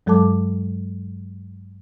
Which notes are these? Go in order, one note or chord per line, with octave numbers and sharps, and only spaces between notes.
G2 F#3 G#3 A4 A5 D6